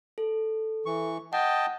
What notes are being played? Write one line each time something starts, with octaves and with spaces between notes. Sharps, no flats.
A4
E3 C#6
D#5 F#5 G5 A5